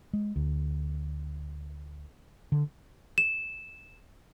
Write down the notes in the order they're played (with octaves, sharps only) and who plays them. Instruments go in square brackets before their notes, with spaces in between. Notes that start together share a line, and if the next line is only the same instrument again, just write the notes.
[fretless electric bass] G#3
D2
D3
[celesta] E7